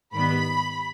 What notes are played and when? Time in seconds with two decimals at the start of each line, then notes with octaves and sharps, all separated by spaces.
0.13 G#2 D#3 G3 B3 B5